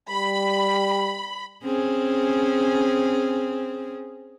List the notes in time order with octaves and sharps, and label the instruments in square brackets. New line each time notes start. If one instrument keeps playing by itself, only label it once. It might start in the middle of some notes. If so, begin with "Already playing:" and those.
[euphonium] G3 [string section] B5
[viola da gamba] C4 C#4 G#4